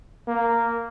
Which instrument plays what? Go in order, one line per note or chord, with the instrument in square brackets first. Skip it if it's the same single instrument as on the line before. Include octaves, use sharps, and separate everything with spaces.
[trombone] A#3